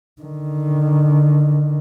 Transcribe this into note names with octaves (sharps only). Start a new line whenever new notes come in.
D3 D#3